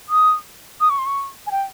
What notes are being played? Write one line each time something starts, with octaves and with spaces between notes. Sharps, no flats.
D#6
D#6
C#6
C6
C#6
G#5
G5